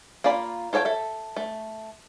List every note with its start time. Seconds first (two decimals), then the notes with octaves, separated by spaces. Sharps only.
0.24 A#3 F4 D5 B5
0.73 F4 A4 C#5 D5 G5
0.85 A4 E5
1.37 A3